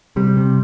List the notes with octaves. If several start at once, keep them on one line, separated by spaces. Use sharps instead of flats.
C3 G3
C3